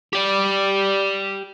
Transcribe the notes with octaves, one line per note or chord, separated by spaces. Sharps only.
G4 D5